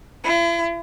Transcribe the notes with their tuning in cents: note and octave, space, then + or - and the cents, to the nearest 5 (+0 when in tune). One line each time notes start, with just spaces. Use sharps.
E4 +45